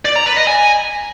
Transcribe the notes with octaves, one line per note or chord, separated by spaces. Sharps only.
D5
A#5
B4
D#5
G#5